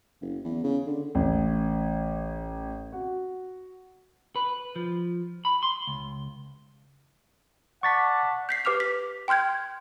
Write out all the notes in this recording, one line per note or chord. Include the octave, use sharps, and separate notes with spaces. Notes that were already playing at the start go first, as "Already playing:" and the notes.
F#1
E2
C#3
D3
A1
F#4
B4
F3
B5
C6
C#2
D5 F#5 A5 C#6 A6 B6
G6 B6 C7
G4 B4 D6 F6 F7
B6
G5 C6 F6 G6 G#6